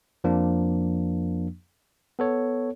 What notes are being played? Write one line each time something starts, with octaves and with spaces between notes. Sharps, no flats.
F2 F3 A#3 D4
B3 A4 C#5